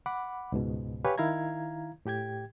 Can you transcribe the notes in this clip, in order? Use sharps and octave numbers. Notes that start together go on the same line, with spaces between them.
F#5 B5 D6
C#2 G#2 B2
G4 B4 C#5 F5 G#5 C#6
D#3 E4 F5 A#5 G#6
A2 G4 G5 G#6